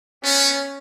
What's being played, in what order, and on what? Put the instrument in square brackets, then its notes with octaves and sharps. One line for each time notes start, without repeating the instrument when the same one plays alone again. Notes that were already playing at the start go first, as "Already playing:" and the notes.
[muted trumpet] B3 [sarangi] C#4